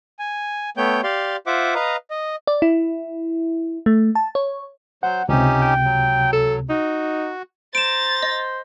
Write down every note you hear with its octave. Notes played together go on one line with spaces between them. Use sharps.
G#5
A3 B3 C#5 G5 G6
G4 D5 F5 C6
F4 C5 E5 F#5 D6
B4 D#5 F5 A#5
D#5
D5
E4
A3
A5
C#5
F#3 C5 F#5 G6
C#2 C3 C#4 D#4 G4
G5
F#3
A4
D#4 F#4
C5 A#5 A6 D7 E7
D#5